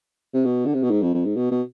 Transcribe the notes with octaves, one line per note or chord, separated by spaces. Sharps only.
C3
B2
D3
C3
B2
G#2
F2
F2
G#2
B2
B2